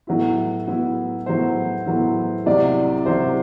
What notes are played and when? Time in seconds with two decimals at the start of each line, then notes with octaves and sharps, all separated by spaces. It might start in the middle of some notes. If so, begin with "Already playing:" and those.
0.07 A2 F#3 B3 E4
0.68 A2 F#3 B3 E4
1.26 A2 F#3 B3 E4 C5
1.86 A2 F#3 B3 E4
2.46 C2 C3 F#3 D5
3.06 C2 C3 F#3 C5